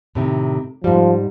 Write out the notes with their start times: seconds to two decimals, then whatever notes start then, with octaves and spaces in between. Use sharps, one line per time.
0.15 A2 C3 D#3
0.84 G#2 F3 G3